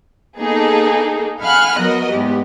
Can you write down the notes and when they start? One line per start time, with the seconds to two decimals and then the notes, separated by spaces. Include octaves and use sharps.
0.38 A#3 B3 D#4 G#4 A4
1.41 F5 F#5 G#5 B5 F6 F#6
1.77 F#3 B3 F#4 A#4 D#5
2.13 E2 G#2 B3 G4